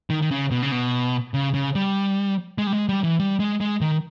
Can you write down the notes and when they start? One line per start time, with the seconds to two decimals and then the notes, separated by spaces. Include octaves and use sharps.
0.10 D#3
0.22 D#3
0.31 C#3
0.51 B2
0.63 C#3
0.72 B2
1.34 C#3
1.54 C#3
1.75 G3
2.58 G#3
2.67 G3
2.73 G#3
2.89 G3
3.04 E3
3.19 G3
3.40 G#3
3.61 G#3
3.81 D#3